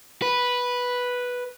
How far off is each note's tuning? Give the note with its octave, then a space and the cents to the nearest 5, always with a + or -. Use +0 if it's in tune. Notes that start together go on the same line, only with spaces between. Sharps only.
B4 -5